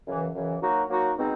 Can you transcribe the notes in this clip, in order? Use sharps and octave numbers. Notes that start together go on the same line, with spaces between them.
F#2 C#3 E3
F#2 C#3 E3
F#3 A#3 D#4 F#4
F#3 A#3 D#4 F#4
B2 G#3 C4 D#4